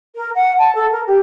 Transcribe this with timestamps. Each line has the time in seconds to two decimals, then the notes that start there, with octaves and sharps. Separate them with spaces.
0.15 A#4
0.35 F#5
0.58 A5
0.75 A4
0.91 A#4
1.07 G4